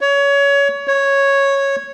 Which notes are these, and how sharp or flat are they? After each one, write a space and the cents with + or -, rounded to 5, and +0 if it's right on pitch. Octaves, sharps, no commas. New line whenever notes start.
C#5 +25
C#5 -5